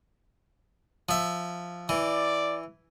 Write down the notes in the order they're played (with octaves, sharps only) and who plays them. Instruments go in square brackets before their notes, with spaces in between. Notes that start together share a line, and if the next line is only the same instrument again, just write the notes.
[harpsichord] F3 E5
[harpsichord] E3 [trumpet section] D5